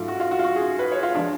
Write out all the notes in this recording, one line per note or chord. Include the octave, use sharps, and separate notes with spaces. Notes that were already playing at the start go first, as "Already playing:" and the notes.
Already playing: G#2 F#3 A3 F4
F#4
F4
F#4
F4
F#4
G#4
B4
C#5
F4
F3 G#3 D4